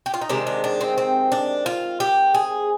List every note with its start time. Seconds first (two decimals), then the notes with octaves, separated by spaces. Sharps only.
0.06 G4
0.14 F4
0.21 D#4
0.29 C3 D#3 G#3 D4
0.47 D4
0.64 D4
0.81 C4
0.98 C4
1.32 D4
1.66 F4
2.00 G4
2.34 G#4